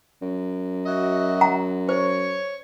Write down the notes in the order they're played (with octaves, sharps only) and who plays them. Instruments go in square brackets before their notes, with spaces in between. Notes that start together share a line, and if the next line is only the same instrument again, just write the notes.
[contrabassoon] F#2
[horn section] F#4 D#5 E5
[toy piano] F#5 A#5
[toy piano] C5 [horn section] C#5